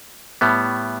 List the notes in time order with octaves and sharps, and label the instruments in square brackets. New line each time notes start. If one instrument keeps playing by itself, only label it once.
[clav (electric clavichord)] A2 G3 B3